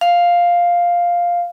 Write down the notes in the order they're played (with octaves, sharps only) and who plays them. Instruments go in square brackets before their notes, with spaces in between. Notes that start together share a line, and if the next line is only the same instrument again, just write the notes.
[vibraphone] F5